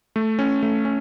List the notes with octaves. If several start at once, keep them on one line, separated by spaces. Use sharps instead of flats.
A3
C#4
A3
C#4